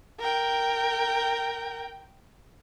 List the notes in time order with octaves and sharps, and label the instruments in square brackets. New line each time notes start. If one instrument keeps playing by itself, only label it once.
[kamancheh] A#4 G5